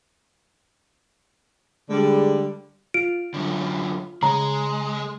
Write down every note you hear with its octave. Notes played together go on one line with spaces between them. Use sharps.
D3 G3 G#3
F4 D7
F#2 D3
C#3 G#3 A#5